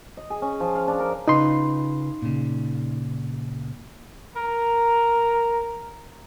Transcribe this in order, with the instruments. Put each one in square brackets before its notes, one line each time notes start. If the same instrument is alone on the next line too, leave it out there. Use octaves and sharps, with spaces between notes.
[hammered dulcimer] D#5
G#4
C#4
F3
F5
D4
A#4
[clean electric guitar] C#3 F4 B4 [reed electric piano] D#4 C6
[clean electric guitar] A#2 C#3
[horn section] A#4 A#5